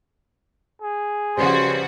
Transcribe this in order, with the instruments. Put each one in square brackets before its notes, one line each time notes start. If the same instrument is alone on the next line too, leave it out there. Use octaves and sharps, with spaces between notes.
[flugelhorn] G#4
[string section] C#3 F3 F#4 [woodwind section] G3 B4 C5 [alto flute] C6